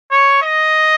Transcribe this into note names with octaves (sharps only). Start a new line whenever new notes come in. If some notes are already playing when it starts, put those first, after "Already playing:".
C#5
D#5